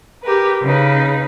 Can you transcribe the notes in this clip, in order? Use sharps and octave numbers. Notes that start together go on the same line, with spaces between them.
G4 A#4 B4
C#3 D#4 B4